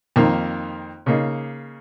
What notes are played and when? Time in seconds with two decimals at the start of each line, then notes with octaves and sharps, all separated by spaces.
0.16 F2 D#3 A#3
1.06 C#3 A#3 D#4